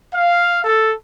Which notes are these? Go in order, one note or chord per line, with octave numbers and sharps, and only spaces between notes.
F5
A4